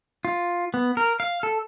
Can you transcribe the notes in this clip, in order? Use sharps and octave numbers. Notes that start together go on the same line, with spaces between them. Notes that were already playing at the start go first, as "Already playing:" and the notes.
F4
B3
A#4
F5
A4